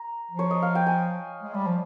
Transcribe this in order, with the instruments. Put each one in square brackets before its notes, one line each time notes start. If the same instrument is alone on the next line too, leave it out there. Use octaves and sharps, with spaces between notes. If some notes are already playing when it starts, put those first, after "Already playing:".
Already playing: [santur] A#5
[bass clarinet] F3
[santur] C#5
D#5
F5
G5
G#5
[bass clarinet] G#3
G3
F3